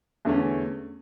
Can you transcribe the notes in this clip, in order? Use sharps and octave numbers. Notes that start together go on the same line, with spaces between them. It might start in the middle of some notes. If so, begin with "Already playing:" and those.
E2 D3 A3 C#4